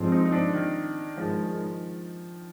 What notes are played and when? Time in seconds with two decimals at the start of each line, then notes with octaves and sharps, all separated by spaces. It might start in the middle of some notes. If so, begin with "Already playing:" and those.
Already playing: G2 F3 G#3 C4
0.12 D#4
0.25 D#4
0.32 D4
0.53 D#3
1.17 G2 D#3 F3 G#3